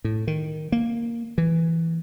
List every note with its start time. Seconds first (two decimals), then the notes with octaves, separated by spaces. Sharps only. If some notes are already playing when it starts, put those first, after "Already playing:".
0.04 A2
0.27 D#3
0.72 A#3
1.38 E3